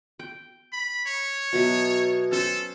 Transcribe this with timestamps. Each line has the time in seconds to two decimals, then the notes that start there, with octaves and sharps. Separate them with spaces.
0.20 G5
0.72 B5
1.06 C#5
1.53 B2 F#3 E5
2.32 C#4 A4 C5